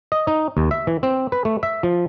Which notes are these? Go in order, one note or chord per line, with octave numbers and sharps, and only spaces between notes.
D#5
D#4
D#2
E5
E3
C4
B4
A3
E5
F3